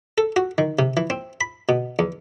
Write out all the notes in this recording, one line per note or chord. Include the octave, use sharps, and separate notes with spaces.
A4
F#4
D#3
C3
E3
C4
B5
B2
E2